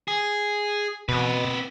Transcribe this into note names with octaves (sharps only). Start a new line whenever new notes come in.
G#4
B2 C4 B4